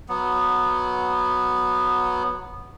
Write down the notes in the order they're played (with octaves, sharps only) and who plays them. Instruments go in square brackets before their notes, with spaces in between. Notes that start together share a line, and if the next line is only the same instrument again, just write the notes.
[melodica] F#3 B3